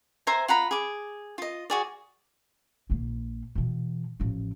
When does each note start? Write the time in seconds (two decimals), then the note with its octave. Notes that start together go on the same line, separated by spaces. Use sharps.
0.27 C5 E5 G#5 A#5
0.48 F4 F#5 A#5 B5
0.71 G#4 D6
1.38 F4 D#5
1.70 F#4 G#4 D5
2.90 A#1 A#3
3.55 B2 E3
4.20 A1 F3